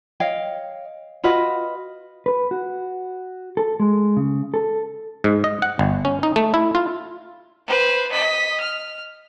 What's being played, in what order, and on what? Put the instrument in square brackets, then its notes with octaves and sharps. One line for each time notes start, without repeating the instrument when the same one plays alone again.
[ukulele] C#5 D#5 F5 G5
F4 F#4 B4 D#5
[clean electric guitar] B4
F#4
A4
G#3
C#3
A4
[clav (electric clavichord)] G#2
D#5
F#5
G1
C#4
D#4
A3
E4
F4
[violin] B4 C5
D#5 B6
F6